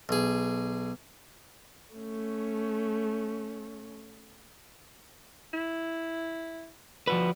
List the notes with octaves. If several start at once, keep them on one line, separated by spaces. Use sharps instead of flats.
B1 G#4
A3 C#4
E4
F3 G3 F#4 B4